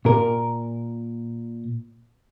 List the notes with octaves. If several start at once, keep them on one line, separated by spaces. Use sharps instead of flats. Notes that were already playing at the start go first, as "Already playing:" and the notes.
A#2 A#4